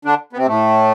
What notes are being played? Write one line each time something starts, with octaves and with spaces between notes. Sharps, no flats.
D3 D4
B3
C3 C4
A2 A3